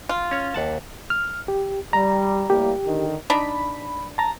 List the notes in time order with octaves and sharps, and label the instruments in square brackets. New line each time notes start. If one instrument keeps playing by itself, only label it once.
[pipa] F4
[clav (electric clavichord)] C#4 C#5
D#2 F#5 A5
[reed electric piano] F6
G4
[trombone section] G3 [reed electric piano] A#5
[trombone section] A2 G3 A#3 [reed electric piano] G4
[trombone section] D3 D#3
[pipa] D4 D#4 [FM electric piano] B5
[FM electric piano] A5 A#5